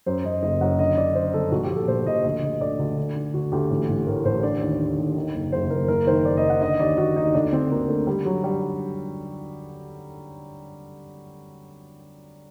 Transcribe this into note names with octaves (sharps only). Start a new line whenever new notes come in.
F#2 C5
F#2 D#5
F#1 D#5
F#2 F#5
D3 D#5
D3 D5
D3 C5
G1 A4
A#1 F#4
G4
A#1
A4
A#2 C5
A#1 D#5
D2 D#5
D2
D2 D5
D2
D3
D3
D2 F#4
D2 G4
A1
A1
A2 A#4
A1 C5
D3 D5
D#2
D3
D#2
D#3
F#1
F#1 C5
F#1 A#4
F#1 A#4
D#3 C5
F#1 D5
D#5
D#3
F#5
D3 D#5
D#2 D5
D#2 F#4
D#2 D#4
D2 D4
D3 C4
D2 A#3
D3 A3
D3 G3
D3 F#3
G3